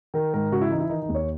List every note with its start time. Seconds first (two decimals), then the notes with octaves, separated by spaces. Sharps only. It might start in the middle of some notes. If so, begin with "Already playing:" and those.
0.14 D#3 A#4
0.34 G#2 A#4
0.52 C#3 F#4
0.61 E4
0.70 E3 D#4
0.80 E4
0.89 D#3 D#4
1.02 D#4
1.09 D#2
1.15 C#5